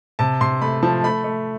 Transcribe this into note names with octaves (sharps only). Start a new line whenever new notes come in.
C3 A5
C3 C6
A3 B5
F3 A5
A3 B5
A3